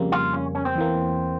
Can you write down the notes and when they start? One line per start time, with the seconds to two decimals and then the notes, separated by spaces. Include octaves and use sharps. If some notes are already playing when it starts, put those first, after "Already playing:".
Already playing: F2 C#3 G3 A#3
0.12 F4
0.33 C#4
0.55 C#4
0.65 C4
0.76 E2 E3 A#3